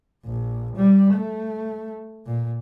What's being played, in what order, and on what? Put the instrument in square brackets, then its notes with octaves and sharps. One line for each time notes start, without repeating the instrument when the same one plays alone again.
[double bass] A#1
G3
A3
A#2